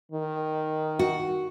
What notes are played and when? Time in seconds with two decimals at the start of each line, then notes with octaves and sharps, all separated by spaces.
0.11 D#3
0.99 F#4